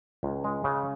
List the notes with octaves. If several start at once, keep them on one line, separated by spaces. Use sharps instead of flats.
C#2
G#3
C#3